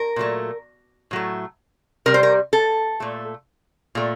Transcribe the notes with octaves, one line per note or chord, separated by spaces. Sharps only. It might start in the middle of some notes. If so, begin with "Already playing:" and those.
Already playing: A#4
A#2 F#3 A3
A2 F#3 A3
C3 G3 A#4
C5
A#4
A4
A#2 A3
A#2 A3